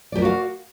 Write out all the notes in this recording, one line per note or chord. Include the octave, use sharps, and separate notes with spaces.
F#4 G4 A#4 D5 F5